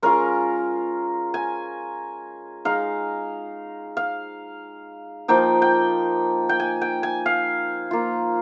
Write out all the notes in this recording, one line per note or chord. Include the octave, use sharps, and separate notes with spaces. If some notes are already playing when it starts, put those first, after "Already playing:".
G#3 C#4 F4 A#4
G#5
G#3 D#4 F5
F5
F3 A#3 D#4 G5
G5
G5
G#5
G5
G#5
F5
A#3 F4